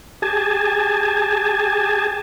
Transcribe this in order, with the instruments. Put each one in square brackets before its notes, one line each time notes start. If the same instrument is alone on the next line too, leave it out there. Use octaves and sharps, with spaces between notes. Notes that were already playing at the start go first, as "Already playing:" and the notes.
[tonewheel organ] G4 G#4 G#5 A5